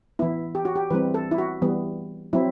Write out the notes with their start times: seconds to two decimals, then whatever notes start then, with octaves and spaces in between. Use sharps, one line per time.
0.19 E3 B3 E4
0.55 G4
0.65 F#4
0.76 G4
0.91 E3 G3 C4 B4
1.14 A4
1.31 E4
1.38 F#4
1.62 E3 G3 B3
2.33 F#3 C4 E4